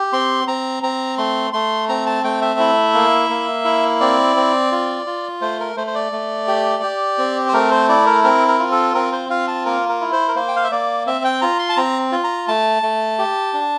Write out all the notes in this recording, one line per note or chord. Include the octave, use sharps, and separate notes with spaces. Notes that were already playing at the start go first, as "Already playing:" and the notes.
Already playing: G4
C4 C6
C4 A#5
C4 A#5
A3 C6
A3 C6
C4 A#5
A5
A3 G5
E5
E4
A#3
A#3
E4
C4 D5
C4
F4
F4
A3 C5
A#4
A3 C5
C5
D5
A3
G4
G4
C4
C5
A3 A#4
C5
E4 D5
A#4
C4 A#4
A#4
F4
A4
C4 A#4
C5
F4 F5
A5
A#3 A#4
A#4
E4
C5
A#4
A#3 C5
G5
F5
E5
A#3 D5
C4 E5
G5
F4 A#5
C6
A5
C4 A#5
F4
A#5
A3 A5
A3
G4
D4